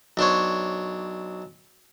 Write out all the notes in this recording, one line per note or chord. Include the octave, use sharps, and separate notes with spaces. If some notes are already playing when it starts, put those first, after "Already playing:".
B1 D4 C5 C#5